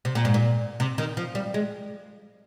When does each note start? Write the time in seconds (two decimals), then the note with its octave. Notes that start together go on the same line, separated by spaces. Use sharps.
0.05 C3
0.15 A#2
0.25 G#2
0.34 A#2
0.80 C3
0.98 D#3
1.17 F3
1.35 G3
1.54 G#3